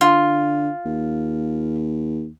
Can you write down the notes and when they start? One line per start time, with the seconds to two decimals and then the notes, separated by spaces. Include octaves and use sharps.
0.01 D3 F4
0.85 D#2